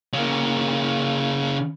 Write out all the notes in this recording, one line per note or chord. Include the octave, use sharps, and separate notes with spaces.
C#3 A#3